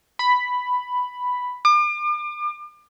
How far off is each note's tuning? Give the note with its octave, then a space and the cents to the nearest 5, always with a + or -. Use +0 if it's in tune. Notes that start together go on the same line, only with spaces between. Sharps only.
B5 +5
D6 +40